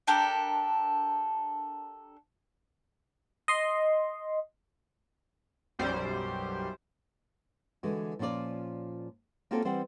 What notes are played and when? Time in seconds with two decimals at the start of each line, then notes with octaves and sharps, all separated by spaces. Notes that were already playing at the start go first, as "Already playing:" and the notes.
0.07 D4 G4 A4 A#4
3.48 D#5 C6
5.79 B1 F#2 G3 C5
7.83 D3 E3 G#3 F#4
8.19 A#2 F3 C#4 F4 D5
9.51 A#3 C4 C#4 F4 F#4 A4
9.65 E3 G3 C4 C5 D5 F#5